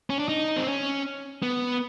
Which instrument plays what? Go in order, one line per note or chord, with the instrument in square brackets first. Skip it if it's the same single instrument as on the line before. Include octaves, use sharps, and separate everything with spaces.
[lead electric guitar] C#4
D4
D#4
C4
C#4
B3